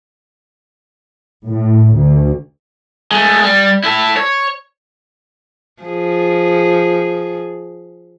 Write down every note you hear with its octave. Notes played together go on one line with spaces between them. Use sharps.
A2
D2
G#3 A3
G3
E4 A4
C#5
F3 G#4